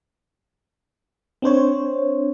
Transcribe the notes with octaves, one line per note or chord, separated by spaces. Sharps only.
C4 D4 C5 C#5